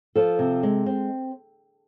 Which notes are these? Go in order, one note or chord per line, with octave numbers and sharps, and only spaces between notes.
F3 A4
C3
G#3
C4